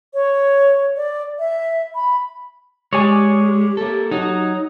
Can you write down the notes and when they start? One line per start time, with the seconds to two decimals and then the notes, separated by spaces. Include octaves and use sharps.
0.14 C#5
0.96 D5
1.39 E5
1.95 B5
2.93 G#3 G4 C#5 D5 G#5
3.77 A#3 A4
4.11 F#3 D#4